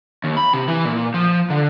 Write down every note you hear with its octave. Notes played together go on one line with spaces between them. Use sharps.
D#2
B5
C3
E3
A#2
F3
D3